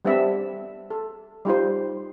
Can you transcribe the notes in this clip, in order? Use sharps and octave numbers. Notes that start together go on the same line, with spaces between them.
G3 B3 C4 D4 E5
A4
G3 D#4 F4 C5